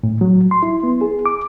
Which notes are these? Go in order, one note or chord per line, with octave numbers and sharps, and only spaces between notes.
A2
F#3
C6
E4
B3
G#4
D6